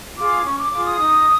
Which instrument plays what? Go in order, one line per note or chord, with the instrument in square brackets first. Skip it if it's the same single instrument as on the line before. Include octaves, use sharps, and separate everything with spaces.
[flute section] F4 G#4 D6
C#4 C#6
D6
F4 G#4 D6
D#6
D#4